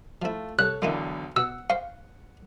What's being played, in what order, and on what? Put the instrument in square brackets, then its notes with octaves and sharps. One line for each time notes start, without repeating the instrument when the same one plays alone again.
[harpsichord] F3 E4 [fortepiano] A3 F4
[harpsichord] C2 [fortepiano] A4 C#5 [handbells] F#6
[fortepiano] B1 E2 D3 [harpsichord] A#3 D#4 E4
[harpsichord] B2 [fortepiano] F#5 [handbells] E6
[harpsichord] C5 G5 C#6 [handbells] F5